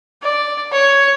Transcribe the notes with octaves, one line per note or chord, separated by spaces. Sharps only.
D5
C#5